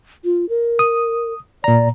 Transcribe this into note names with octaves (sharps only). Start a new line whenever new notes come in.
F4
A#4
D#6
A#2 D5 A#5